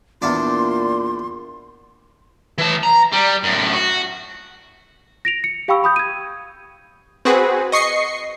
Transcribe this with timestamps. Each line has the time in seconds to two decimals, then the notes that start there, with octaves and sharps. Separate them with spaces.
0.22 E2 A#2 D4 C6
2.58 E3 A5
2.83 A#5
3.12 G3
3.43 F#2 A2
3.73 F#4
5.25 A#6 D7 F7
5.44 C#7
5.68 G4 F5 G5 B5 C#6 E6
5.84 B5 D#6 G6
5.96 G#6 D#7
7.25 C4 F#4 G#4 B4
7.72 D#5 C#6 C7 C#7